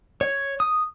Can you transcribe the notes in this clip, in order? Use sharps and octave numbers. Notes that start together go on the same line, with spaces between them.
C#5
D#6